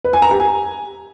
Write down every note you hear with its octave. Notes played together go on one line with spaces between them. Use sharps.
B4
G#5
A#5
G4
G#5